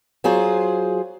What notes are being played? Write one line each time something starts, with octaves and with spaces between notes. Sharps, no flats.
F#3 F4 G#4 C5